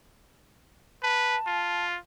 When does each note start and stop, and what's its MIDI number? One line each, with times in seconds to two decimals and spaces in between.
1.03 1.36 71
1.03 1.85 81
1.47 1.97 65